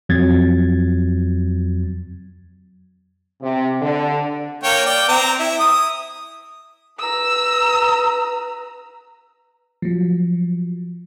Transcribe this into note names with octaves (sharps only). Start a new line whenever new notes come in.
F2 F#3 G#6 A6
C3
D3
A#3 C#5 G5
D5 G5
C4 A#5
E4
D#6
B4 A#5 E6
F3 F#3